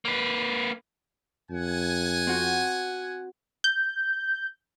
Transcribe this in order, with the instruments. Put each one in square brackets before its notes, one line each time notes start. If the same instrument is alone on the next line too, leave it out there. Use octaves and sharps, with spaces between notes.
[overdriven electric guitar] A#3 B4
[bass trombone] F2 [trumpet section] F#5 G#5
[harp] C4 F#4 G6
[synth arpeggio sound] G6